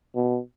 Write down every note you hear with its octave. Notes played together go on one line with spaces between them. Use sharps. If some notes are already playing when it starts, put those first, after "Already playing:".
B2